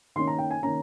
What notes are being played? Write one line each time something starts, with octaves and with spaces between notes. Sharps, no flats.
D#3 A#3 C#4 C6
A#5
G5
G#5
D#3 A#3 C#4 A#5